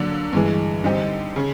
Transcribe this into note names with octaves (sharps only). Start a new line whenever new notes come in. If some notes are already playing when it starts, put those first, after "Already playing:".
Already playing: D3 F#3 A#3 D4
G2 E3 G#3
D3 G3 C4 D#4 G4
C#3